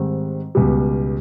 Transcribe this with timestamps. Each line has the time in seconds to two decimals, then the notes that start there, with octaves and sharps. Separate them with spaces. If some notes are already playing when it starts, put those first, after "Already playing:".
Already playing: G#2 D#3 G3 C4
0.55 C#2 B2 G3